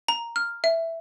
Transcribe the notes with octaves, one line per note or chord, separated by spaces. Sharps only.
A#5
F6
E5